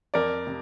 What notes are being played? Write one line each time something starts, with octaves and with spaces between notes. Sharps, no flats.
F2 A#4 D5
C3